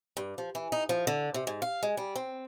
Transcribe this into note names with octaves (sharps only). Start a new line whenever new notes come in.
G2
F3
E3
D#4
F3
D3
C3
G#2
F5
G#3
G3
C4